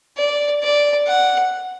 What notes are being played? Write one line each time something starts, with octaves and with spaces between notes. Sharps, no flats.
D5
D5
F#5